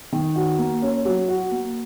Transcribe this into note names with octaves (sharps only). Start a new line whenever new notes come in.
D#3
F#4
A#3
C#4
F#3
F#4
A#3